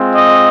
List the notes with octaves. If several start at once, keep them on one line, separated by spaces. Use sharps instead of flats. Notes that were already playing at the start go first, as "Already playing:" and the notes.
Already playing: G#3 C4 F4
D#5